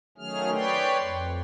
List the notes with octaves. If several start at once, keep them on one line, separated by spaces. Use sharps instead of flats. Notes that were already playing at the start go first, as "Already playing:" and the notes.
D#3 F#3 A3 C#4 G#4 F6
B4 C#5 D5 G5 C6
F2